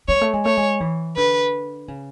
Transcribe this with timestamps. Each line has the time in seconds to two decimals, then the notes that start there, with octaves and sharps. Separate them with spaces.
0.08 G#3 C#5
0.21 A3
0.33 G#3
0.45 A3 C#5
0.57 G#3
0.80 E3
1.16 D3 B4
1.88 C#3